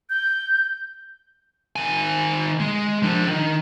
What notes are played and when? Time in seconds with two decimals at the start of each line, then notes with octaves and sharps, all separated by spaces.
0.10 G6
1.76 D#3 G#5
2.60 G#3
3.02 F3 D4
3.27 D#3